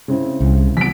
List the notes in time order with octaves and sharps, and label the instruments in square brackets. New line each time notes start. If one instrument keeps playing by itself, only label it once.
[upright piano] C#3 C4 E4
[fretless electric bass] C2
[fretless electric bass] E3 F#3 B3 [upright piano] B6 D7